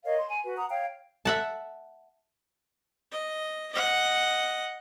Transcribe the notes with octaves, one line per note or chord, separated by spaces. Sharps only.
A#4 C#5 D#5 F5
C6
G#5
F#4 B4
F#5 A#5 D#6
C#5 F5 G5
E5 F#5 A5
D#5
D#5 F#5